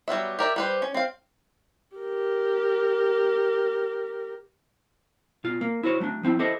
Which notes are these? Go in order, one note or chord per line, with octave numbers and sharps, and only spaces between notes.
F#3 G3 B3 E5
G4 A#4 D5 E5
G3 B4 C5
C#4
C4 F5
G4 A#4
B2 F4
A#3
E4 F#4 C5 C#5
F#3 A3 C#4 D4
F3 C4 E4
E4 G4 A4 C5 D#5 E5